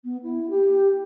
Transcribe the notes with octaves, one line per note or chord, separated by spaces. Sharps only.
B3
E4
G4